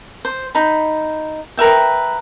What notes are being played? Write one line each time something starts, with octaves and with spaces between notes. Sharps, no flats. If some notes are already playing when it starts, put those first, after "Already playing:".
C5
D#4 B5
A#4 B4 E5 G5